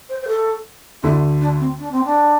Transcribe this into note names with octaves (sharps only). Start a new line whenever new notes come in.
C5
C5
A4
D2 D3 A3 E4
D4
C4
D4
C4
D4